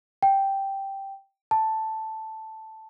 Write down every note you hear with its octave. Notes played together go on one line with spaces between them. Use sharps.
G5
A5